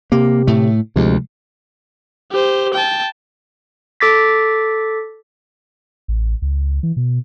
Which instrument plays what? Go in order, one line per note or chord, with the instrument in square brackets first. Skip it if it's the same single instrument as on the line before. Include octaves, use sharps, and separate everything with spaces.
[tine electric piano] C3 G4 [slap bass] A#3
[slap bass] A2 A3
[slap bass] D2 [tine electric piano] C3 F3 G#3
[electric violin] G4 C5
G5 A5
[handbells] A4 D6 A6 B6
[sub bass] A1
C#2
E3
B2